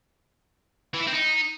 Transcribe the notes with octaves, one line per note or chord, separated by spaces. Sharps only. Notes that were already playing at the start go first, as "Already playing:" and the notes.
E3
E4
C4
D#4